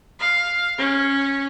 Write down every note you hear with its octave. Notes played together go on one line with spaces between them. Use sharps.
F5
C#4